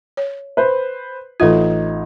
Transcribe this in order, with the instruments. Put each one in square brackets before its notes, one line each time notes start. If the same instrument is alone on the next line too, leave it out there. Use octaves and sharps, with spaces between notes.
[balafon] C#5
[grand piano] B4 C5
[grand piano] A1 D#4 G#6 [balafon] F4 A4